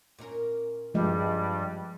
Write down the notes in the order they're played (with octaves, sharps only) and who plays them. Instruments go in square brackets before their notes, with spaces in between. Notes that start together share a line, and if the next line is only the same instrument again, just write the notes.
[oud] A#2 C#4 A#4
[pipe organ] G2 G3 [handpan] F3 G#3